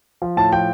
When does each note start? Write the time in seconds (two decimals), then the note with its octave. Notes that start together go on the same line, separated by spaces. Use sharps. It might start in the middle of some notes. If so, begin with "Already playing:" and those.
0.22 F3
0.37 A2 A5
0.52 F3 G5